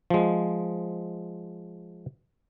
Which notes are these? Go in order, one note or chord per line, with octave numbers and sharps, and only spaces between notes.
F3 G#3